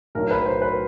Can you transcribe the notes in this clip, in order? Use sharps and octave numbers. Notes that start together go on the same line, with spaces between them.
B1 A2 F#3 A#4
B4
C5
B4